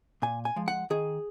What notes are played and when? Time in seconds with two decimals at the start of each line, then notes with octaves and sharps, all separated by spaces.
0.22 A#2 G#5
0.45 G#5
0.56 F3 G#3
0.68 F#5
0.90 D#3 G#4